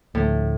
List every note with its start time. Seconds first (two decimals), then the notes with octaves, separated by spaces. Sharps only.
0.14 D2 A2 D3 F3 A3